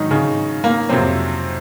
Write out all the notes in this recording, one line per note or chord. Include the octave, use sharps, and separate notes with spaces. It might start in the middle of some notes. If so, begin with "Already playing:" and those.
Already playing: G#2 D#3 F#3 D#4
C#3 C#4
A#3
F2 C3 F#3 C4